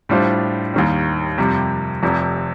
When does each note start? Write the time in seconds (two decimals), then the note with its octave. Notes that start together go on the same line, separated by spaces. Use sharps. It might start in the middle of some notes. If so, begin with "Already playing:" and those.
0.09 A2 G3 D4 F4 C5
0.74 D#2 D#3 G3
1.38 F2 C3 G3
2.02 F1 F2 C3 F3